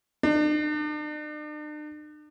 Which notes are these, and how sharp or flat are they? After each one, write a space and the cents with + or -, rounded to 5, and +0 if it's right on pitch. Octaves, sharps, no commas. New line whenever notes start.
D4 +45